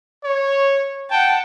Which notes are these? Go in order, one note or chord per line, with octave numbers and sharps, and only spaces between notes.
C#5
F#5 G5 A5